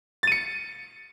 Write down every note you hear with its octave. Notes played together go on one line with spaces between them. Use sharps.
A6 C#7 D#7